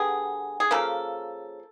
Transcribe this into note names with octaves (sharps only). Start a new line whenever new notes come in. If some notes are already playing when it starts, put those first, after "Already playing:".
Already playing: D3 G3 B3 G#4
G#4
C#3 F3 A#3 A4